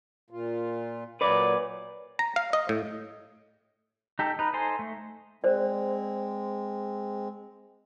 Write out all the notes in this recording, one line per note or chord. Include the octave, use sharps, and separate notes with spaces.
A#2 F4
A#2 F#3 B4 D5
A#5
F5
D#5
A2
D#4 G4 A4
D#4 B4
D#4 A4 C5 G#5 C6
A3
G#3 C4 C5 D5